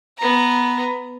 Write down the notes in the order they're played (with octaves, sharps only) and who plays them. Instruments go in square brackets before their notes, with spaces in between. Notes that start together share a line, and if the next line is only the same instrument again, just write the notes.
[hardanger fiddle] B3 A#5